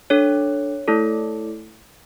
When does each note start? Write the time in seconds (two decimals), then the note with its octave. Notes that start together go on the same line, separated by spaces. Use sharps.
0.10 D4 A4 C#5
0.88 A3 E4 A4